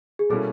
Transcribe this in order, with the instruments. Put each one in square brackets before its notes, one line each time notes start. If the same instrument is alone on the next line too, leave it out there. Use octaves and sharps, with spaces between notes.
[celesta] G#4
[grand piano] B2 G3 A#3 C#4 E4 [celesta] A4